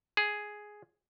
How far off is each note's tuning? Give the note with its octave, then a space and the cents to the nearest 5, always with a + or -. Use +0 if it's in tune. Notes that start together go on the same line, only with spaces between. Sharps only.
G#4 +5